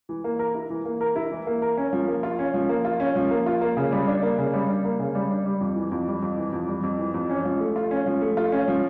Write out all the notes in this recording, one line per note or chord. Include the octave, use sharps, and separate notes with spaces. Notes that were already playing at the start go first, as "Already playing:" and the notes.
E3
A#3
A#4
E4
E3
A#3
A#4
E4
E3
A#3
A#4
C#4
F3
A#3
F4
C#4
F3
A#3
F4
C#4
F3
A#3
F4
A#3
C#3
G3
D4
A#3
C#3
G3
D4
A#3
C#3
G3
D4
G3
F2
E3
F2
G3
F2
E3
F2
G3
F2
E3
F2
C#4
F3
A3
F4
C#4
F3
A3
F4
C#4
F3